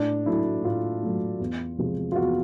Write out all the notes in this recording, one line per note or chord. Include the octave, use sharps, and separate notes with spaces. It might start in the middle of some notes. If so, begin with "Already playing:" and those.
Already playing: A2 D4
F#3 A3 E4
A2 F4
F#3 A3
E2
C3 F3 G#3
F4
E2 F#4